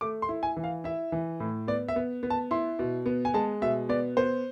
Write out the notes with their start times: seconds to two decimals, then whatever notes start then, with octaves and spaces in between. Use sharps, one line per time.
0.01 A3 D6
0.22 C6
0.29 E4
0.43 G#5
0.57 E3
0.64 F5
0.84 E4 E5
1.12 E3
1.40 A2
1.68 B3 D5
1.88 E5
1.96 B3
2.23 B3
2.30 A5
2.51 E4 C6
2.79 B2
3.06 B3
3.25 G#5
3.34 G#3 A5
3.62 B2 E5
3.89 B3 D5
4.17 B3 C5